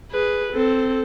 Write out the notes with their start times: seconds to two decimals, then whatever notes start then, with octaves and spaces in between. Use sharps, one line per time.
0.11 G#4 B4
0.52 C4 A4